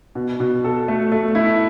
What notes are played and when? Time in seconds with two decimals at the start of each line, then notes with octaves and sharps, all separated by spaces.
0.15 B2
0.40 B2
0.64 A4
0.88 A3
1.12 A3
1.35 E4